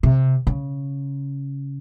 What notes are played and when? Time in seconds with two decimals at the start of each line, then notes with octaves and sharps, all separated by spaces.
0.03 C3
0.47 C#3